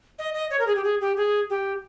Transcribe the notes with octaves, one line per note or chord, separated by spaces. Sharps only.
D#5
D#5
C#5
A#4
G#4
G4
G#4
G4
G#4
G4